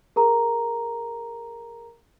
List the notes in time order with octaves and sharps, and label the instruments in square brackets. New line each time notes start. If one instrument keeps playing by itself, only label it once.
[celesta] G#4 A#4 A#5